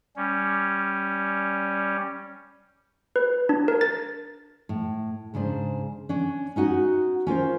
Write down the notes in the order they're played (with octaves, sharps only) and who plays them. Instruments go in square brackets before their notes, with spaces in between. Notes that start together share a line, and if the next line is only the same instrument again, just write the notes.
[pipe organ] G3 C#4
[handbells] B4
D4
A#4
A6
[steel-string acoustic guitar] A2
G#2 C#3 D4 C5
C#4 D4
C#4 D#4 F#4 F#5
C#4 F4 A#4 C5